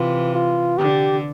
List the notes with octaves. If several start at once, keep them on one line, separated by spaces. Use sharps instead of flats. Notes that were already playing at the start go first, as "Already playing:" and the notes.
Already playing: C3 E3 F4
F4
D3 G4